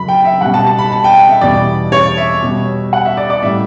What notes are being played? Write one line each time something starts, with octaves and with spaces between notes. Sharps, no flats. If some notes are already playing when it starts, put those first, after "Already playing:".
Already playing: F#2 C#3 F#3 B5
G5
E5
B2 G3 F#5
A5
A5
B5
A5
G5
G5
E5
E2 B2 G3 D5
C#5
E5
B2 G3
F#5
E5
D5
D5
A2 G3 E5